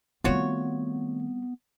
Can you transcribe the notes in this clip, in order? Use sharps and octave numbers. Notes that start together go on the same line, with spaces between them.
D#3 G3 A3 B3 C4 F4 F#4 C#5